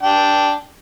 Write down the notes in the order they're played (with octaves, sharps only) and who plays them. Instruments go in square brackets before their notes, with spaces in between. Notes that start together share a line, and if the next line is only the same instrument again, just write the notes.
[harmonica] D4 G5